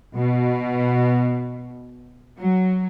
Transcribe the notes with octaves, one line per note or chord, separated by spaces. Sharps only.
B2
F#3